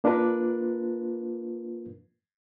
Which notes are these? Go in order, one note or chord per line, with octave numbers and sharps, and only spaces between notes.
A#3 D4 F4 A#4 B4